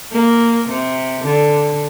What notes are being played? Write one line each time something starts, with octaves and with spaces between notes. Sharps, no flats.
A#3
C3
D3